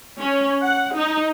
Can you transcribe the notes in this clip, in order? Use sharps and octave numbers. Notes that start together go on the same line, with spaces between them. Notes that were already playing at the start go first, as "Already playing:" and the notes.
C#4
F#5
D#4